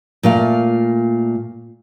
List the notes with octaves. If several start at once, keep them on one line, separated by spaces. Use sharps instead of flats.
A#2 A3 F5